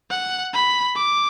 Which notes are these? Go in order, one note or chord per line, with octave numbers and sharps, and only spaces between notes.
F#5
B5
D6